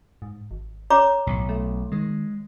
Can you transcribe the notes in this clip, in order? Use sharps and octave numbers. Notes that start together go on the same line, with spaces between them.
G#2
G#1
C#5 A#5 D6
B1 A2
A3
D#3 G#3